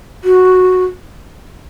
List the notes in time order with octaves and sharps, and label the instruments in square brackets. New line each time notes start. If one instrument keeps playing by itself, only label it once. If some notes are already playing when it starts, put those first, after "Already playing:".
[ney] F#4